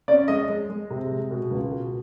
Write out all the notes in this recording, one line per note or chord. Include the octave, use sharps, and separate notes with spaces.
C#4 D5
G#3 D#5
G#3
G#3
C3
G#3
B2
C#2
B2